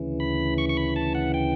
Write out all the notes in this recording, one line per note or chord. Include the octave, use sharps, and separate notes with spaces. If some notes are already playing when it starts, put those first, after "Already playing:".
Already playing: D2 C#3 E3
B5
C#6
C#6
B5
A5
F#5
G5